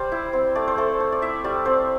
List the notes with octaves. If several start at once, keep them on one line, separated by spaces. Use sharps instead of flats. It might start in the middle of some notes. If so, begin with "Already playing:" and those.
Already playing: G3 C5 D5
E4
C4
A3 D5
C5
A3 A4
A3
D5
E4 E5
G3 D5
C4 C5